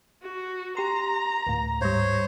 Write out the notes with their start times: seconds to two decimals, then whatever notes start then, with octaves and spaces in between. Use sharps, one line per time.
0.22 F#4
0.77 G4 A#5 C6
1.47 D2 A2
1.81 G#2 G3 C5 C#5